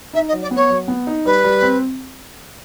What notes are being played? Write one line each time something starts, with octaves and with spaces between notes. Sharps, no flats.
D#4 E5
D#5
F#3
D5
B3 C#5
F#3
B3
D#4
G3 B4
G3
C4